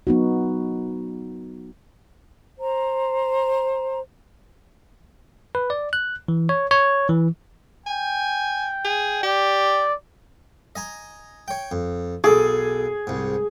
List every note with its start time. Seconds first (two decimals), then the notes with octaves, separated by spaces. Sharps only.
0.07 F#3 B3 D#4 F#4
2.59 C5 A#5
5.55 B4
5.70 D5
5.93 F#6
6.28 E3
6.49 C#5
6.71 C#5
7.09 E3
7.86 G5 G#5
8.85 G#4
9.23 G4 D5
10.76 D#5 G#5 A#5
11.48 C#5 G5
11.71 F2
12.24 B1 G#4 A4 D6
13.07 C2 G#2